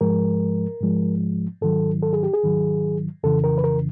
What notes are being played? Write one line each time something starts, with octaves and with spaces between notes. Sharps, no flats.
G#2 F3 G#3 A#4
G#2 F3 G#3
G#2 D#3 F#3 A4
A4
G#4
G4
G#4
G#2 D#3 F#3
F2 C#3 E3 A4
A#4
B4
A#4